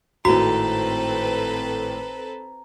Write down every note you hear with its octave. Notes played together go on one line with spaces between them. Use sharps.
G#1 A2 C4 F#4 A4 B4 A#5